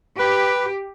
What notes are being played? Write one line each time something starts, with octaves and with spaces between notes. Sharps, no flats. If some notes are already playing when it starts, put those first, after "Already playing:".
G4 B4